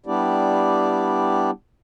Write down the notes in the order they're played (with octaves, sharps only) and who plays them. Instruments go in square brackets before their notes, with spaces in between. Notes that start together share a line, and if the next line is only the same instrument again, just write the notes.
[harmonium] G3 B3 D4 E4 G4 D5